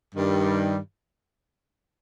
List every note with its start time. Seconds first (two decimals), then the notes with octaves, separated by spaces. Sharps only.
0.15 G2 D#3 G3